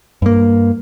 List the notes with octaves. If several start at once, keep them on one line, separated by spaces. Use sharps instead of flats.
G2 A#3